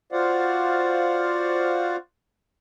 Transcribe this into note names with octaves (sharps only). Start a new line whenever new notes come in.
F4 F#4 C5 D5 F5 F#5